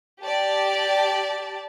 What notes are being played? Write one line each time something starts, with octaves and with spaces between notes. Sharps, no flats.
G4 D5 A5